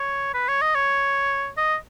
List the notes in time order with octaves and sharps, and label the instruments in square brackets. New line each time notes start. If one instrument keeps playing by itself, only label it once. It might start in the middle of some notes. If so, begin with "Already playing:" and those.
Already playing: [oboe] C#5
B4
C#5
D#5
C#5
D#5